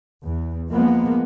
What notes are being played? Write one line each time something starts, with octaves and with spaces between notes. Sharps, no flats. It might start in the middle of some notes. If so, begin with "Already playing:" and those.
E2
F3 G#3 A#3 B3